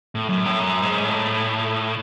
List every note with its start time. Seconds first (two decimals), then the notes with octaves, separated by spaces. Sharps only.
0.15 A2
0.29 F#2
0.45 A2
0.60 F#2
0.82 G#2
1.05 A2